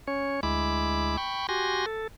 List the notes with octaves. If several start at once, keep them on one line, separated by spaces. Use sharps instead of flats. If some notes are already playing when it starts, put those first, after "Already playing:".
C#4 C#5
D2 G#3 E4 B5 D6
G5 B5 C#6
F#4 G4 G#5 C6 A#6
A4